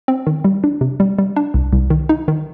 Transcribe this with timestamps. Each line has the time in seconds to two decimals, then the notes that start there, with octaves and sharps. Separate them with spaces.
0.08 C4
0.27 D#3
0.44 G3
0.64 D4
0.81 C3
1.00 G3
1.18 G3
1.36 D4
1.54 C2
1.73 C2
1.90 D#3
2.09 D#4
2.28 D#3